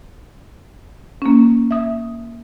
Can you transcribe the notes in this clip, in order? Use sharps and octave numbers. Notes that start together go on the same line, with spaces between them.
A#3 C#4
E5 D#6